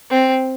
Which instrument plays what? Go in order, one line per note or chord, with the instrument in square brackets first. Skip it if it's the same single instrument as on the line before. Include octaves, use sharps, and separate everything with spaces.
[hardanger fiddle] C4